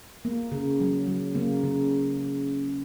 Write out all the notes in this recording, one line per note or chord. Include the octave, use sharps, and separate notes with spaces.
A#3
C#3
F#3
F#3
C#3 A#3
C#3